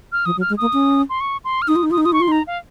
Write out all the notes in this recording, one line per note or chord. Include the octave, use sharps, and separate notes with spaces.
F6
F3 D#6
F#3
F6
G#3
A#3 D#6
C#4
C6
C#6
C6
F6
D#4 D#6
F4
D#4
F4 D#6
D#4
F4 D#6
D#4 C#6
F4 C6
D#4 A#5
F5